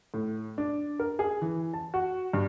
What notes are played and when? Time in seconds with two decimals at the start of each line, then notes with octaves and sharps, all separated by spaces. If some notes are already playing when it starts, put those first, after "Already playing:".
0.14 A2
0.58 D4
0.99 A#4
1.19 G#4
1.42 E3
1.73 A5
1.94 F#4
2.33 G2